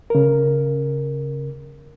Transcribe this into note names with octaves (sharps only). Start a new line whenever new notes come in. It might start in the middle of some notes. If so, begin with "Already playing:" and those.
C#3 A#4